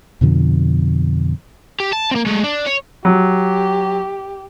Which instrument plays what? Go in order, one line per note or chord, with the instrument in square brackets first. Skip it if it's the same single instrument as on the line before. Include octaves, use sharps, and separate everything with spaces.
[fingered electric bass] F2 B2 D3 F3
[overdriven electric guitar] G4
A5
A#3 C4
G#3 A3
D4
C#5
[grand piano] F#3 [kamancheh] G4